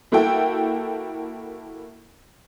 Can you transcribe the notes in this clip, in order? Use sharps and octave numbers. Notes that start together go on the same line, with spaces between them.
A#3 E4 F#4 A4 G5